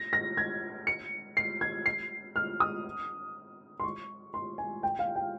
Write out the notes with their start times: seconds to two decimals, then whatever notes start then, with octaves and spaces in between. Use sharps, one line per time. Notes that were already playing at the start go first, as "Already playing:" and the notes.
Already playing: A#6
0.13 A#6
0.37 G#6
0.87 C#7
1.37 C7
1.61 G#6
1.86 C7
2.36 F6
2.60 D#6
3.80 C6
3.83 C#6
4.34 C6
4.58 G#5
4.83 G5
4.99 F5
5.16 G5